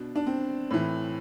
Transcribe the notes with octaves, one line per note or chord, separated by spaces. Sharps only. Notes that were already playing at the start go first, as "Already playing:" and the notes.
Already playing: B2 D4
D4
C4
A2 E3